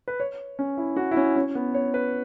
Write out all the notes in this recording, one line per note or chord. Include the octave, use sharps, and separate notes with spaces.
B4
C#5
C#4
E4
F#4
E4
C#4
C#4
B3
C#5
B4